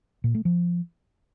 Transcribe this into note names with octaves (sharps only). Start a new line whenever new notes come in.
A#2
A3
F3